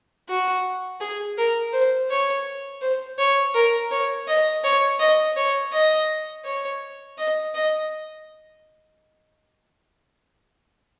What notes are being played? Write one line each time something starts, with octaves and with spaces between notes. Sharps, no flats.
F#4
G#4
A#4
C5
C#5
C5
C#5
A#4
C#5
D#5
C#5
D#5
C#5
D#5
C#5
D#5
D#5